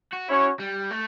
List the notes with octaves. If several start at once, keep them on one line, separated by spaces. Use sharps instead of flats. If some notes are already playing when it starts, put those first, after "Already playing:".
F#4
C#4 E4 F#4 C#5
G3
A3